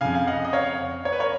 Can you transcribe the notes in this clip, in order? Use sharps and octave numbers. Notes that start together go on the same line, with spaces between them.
F2 C#3 F5 G#5
F5
D#5 F#5
D#5
C#5 F5
C#5
B4
A#4 C#5